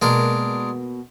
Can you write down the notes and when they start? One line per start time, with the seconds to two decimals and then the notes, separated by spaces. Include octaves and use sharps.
0.02 B2 G#3 A#3 D4 A#4